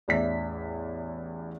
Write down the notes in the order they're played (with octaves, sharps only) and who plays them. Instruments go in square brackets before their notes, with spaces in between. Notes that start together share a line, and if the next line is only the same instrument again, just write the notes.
[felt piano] A1 E2 D5 E5 B6